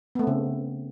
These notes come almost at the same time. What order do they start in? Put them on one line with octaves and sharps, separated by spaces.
B3 A3 C4 C#3